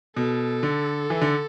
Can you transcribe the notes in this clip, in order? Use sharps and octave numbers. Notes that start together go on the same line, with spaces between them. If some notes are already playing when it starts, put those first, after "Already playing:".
B2 A4
D3
E3
D3